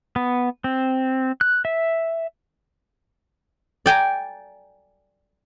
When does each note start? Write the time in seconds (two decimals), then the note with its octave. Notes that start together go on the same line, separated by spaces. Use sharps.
0.16 B3
0.64 C4
1.41 F#6
1.65 E5
3.86 D5 G5 G#5 A#5